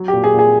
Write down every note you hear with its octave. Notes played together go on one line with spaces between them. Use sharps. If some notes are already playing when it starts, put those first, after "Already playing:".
Already playing: F#3
A#2 G4
G#4
A#2
G#4